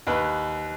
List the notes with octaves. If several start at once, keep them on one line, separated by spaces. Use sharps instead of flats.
D#2 B4